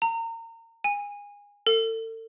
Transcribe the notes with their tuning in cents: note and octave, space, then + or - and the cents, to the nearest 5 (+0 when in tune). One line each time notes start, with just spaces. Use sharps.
A#5 -35
G#5 -25
A4 +35